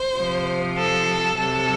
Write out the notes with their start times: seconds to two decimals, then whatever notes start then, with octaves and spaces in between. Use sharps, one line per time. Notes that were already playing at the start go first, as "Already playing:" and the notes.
Already playing: C5
0.15 C3 F3
0.76 A4
1.37 C3 F#3 A4